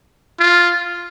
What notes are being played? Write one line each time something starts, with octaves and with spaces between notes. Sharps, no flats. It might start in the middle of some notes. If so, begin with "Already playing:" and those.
F4